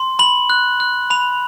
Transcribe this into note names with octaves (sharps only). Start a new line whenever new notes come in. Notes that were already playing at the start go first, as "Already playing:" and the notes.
Already playing: C6
B5 F#7
F#6
F#6
B5 F7